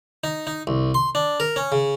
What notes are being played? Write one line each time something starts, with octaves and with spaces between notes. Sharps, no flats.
D#4
D#4
C2
C6
D4
A#4
C#4
C#3